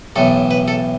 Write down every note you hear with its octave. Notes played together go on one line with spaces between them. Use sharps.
B1 A2 E3 A4
B4
A4